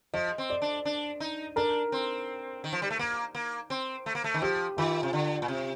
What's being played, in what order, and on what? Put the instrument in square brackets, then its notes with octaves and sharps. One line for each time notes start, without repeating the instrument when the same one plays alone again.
[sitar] F3 [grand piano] D#5
[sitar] C4
[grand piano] D5
[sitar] D4
D4
D#4
[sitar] D4 [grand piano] A#4
[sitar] C4
D#3
F3
G3
A3
A#3
A#3
C4
A3
A#3
A3
D#3
[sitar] F3 [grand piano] G4
[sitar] D#3 [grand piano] F4
[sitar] C3
D3
A#2
C3